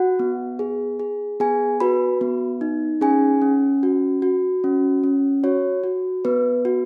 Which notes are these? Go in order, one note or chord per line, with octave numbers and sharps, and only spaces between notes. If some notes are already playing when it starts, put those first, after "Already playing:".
Already playing: F#4 F#5
B3
G#4
G#4
B3 G#4 G#5
F#4 B4 B5
B3
D#4
C#4 G#4 G#5
C#4
F#4
F#4
C#4
C#4
F#4 C#5
F#4
B3 B4
F#4